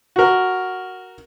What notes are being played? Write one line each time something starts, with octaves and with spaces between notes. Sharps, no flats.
F#4 A#4